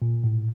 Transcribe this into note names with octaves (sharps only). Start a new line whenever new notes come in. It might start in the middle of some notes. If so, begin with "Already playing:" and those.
A#2
A2